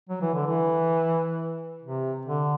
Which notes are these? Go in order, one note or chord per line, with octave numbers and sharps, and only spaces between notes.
F#3
E3
D3
E3
C3
D3